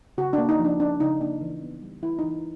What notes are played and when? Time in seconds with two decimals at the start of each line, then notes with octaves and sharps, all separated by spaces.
0.18 C#3 F#4
0.33 D4
0.38 A#3
0.49 D#4
0.59 F3
0.65 D4
0.80 C#4 D4
1.00 C#3 D#4
1.21 A#3 D4
1.41 E3
1.62 B3
1.82 G3
2.02 E3 E4
2.19 D#4
2.23 E3